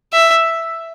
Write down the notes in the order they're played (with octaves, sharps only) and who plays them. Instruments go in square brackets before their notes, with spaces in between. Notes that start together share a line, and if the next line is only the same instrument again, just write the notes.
[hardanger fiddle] E5